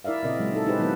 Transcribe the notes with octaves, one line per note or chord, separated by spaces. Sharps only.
E4 A#4 D5 E5 F5
A#2 C#3 C4 A#4 D#5
F#3 G#3
D#4 A4
C#4 D#4 G4 G#4 B4 C5
D#3 F#3 B3 E4 B4